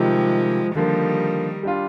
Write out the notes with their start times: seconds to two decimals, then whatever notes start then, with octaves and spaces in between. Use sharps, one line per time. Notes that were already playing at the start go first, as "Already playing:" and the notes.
Already playing: C3 D#3 F3 G3 G#3
0.75 D3 D#3 F3 G3 A#3
1.63 G3 D4 F4